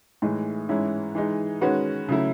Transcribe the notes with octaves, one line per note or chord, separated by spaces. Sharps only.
A2 E3 G#3 D#4 G#4
G#2 E3 G#3 C#4 E4
E3 G#3 D#4 G#4
D#3 G#3 C#4 F#4 B4
C#3 F#3 A3 E4